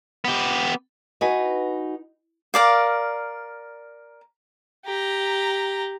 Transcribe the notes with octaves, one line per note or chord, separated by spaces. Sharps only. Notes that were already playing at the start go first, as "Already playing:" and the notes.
B3 G4
D#4 F#4 B4 G#5
A#4 D5 F5
G4 A#5